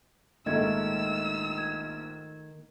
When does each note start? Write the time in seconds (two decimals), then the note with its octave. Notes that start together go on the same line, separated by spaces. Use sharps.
0.46 A#1 G#2 D#3 A3 A4 D#5 E6 G#6
1.58 G#6